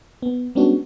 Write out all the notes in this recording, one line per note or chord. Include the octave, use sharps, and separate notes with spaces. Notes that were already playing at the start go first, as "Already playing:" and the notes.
B3
G3 G#3 B3 C#4 D4 F#4